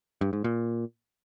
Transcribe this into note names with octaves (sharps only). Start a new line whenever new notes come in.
G2
G#2
A#2